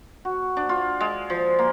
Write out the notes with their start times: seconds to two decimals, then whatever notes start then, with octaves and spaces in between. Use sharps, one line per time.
0.25 F#4
0.57 D4
0.69 F4
1.01 G#3
1.30 F3
1.59 A#3